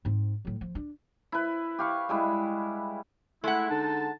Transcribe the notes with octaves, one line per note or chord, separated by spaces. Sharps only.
G#2 C4
A2 F#3
F3
D4
E4 B4
G4 F5 C#6
G3 G#3 E4
G#3 A3 E4 F#5
D3 D#4 A5